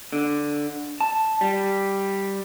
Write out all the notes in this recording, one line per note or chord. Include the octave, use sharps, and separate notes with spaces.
D3
A5
G3